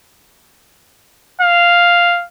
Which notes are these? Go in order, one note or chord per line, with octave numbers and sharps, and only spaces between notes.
F5